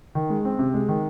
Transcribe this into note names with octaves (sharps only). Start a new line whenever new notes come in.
D#3
G#3
C4
C3
G#3
D#3